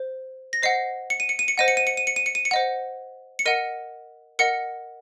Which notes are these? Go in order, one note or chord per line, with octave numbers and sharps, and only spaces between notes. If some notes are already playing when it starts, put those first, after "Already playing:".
Already playing: C5
A#6
C5 D#5 F#5 C7
C#7
D#7
C#7
D#7
C#7
C5 D#5 F#5 D#7
C#7
D#7
C#7
D#7
C#7
D#7
C#7
D#7
C#7
C5 D#5 F#5
C#7
A#4 D#5 F#5 D#7
A#4 D#5 F#5 C#7